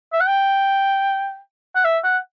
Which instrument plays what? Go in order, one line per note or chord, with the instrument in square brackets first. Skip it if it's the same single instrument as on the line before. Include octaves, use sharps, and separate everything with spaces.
[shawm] E5
F#5
G5
F#5
E5
F#5